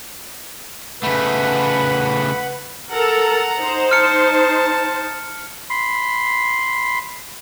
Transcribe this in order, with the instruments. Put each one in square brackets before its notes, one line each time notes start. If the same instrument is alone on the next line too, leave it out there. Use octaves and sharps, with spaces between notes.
[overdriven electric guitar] C#3 A3 [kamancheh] B4 [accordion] F#5 B5
[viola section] A4 A#4 [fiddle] F#5 A#5
[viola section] D#4 C5
[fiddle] A5 [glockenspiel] F6 C#7
[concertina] B5 C6